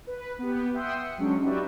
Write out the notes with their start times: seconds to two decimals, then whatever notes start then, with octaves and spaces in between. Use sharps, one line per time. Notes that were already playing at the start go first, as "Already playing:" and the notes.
0.07 B4
0.39 B3 G4
0.74 E5 F#5 G5 C6 D#6 E6
1.04 C#7
1.18 F#3 G#3 C#4 D4
1.42 D#4 F#4 G4 B4 D5 E5